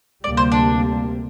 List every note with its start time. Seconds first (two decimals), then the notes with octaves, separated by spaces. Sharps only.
0.24 D2 C3 G3 A#3 D5
0.37 C5
0.52 D4